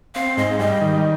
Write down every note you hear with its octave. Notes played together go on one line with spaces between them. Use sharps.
C4 F5
G#2 D#5
G3 D#5
D#3